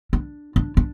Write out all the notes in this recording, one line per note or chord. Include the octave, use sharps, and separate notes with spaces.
D4
D4
D4